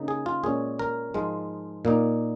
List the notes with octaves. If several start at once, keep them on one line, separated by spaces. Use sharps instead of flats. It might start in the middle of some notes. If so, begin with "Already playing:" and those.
Already playing: C#3 A#3 D#4
G#4
F4
A#2 G#3 C#4 G#4
A#4
G#2 F3 G#3 F4
A#2 A#3 D#4